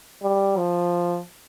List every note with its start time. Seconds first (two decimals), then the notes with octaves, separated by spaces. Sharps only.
0.23 G3
0.57 F3